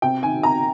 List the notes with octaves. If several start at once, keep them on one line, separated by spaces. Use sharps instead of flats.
C3 G5
D#3 G#5
C3 A#5